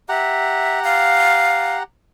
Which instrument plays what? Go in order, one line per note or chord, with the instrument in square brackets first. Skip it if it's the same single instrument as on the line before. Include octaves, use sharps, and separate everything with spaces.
[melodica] G4 F#5 A#5 [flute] E5
[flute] F5